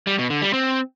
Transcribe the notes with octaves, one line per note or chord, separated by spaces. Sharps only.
G3
B2
D3
G3
C4